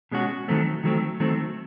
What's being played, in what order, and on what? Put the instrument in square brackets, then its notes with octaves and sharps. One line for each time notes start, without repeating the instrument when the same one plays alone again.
[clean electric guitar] B2 G#3 C#4 F#4
D#3 F#3 A3 C4
D#3 F#3 A3 C4
D#3 F#3 A3 C4